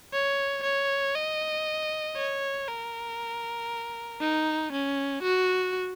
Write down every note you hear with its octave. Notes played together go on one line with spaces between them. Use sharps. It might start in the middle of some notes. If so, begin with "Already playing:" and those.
C#5
C#5
D#5
C#5
A#4
D#4
C#4
F#4